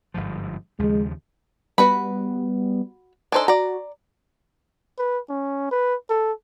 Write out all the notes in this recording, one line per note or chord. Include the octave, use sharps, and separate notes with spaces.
G1 G#2 F3
D#2 C#3 F3 G#3
G3 B3 F#4 B4 B5
D4 D#4 A4 C5 G#5
F#4 D5 A#5
B4
C#4
B4
A4